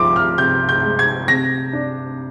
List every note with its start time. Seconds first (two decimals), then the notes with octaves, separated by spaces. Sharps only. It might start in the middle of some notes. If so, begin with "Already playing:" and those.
Already playing: C2 F3 C6 D6
0.16 F6
0.38 C3 G6
0.69 G6
0.84 G#3
0.99 G#6
1.28 C3 A#6
1.73 D4